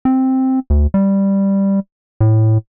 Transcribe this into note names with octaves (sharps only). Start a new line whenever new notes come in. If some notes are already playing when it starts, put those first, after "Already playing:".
C4
D2
G3
A2